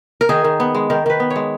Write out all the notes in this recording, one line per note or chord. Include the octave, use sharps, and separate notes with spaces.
A#4
D#3 G#4
D#3
B3
G#3
D#3 A#4
D#3 B4
B3
C#5
G#3